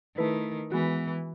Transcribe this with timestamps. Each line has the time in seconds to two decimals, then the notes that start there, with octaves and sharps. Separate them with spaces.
0.17 D#3 A3 E4 B4
0.71 E3 G#3 B3 F#4